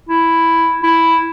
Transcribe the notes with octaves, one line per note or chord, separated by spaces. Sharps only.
E4
E4